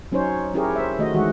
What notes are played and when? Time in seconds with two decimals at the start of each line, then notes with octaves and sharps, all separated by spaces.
0.12 F#3 C#4 D#4 C5 C#5
0.54 C#4 E4 G4 G#4 A#4 C#5
0.76 C5 E5
0.98 D#3 A3 F#4 D#5
1.14 D#3 E3 G#3 F#4